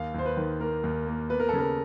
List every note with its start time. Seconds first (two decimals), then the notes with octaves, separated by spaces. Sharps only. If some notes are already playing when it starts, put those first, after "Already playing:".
Already playing: D#2 F5
0.14 D#2 C5
0.25 B4
0.37 D#3
0.60 A#3 A#4
0.84 D#2
1.07 A#3
1.30 B3 B4
1.40 A#4
1.49 A4
1.53 C#3
1.59 A#4